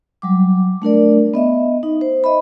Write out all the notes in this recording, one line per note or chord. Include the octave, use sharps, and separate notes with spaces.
F#3 G3 D6
A3 D4 A#4 D5
B3 D#5 E5
D#4
C5
D#5 E5 B5